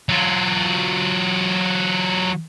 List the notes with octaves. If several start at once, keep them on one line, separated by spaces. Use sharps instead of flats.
F#3 F4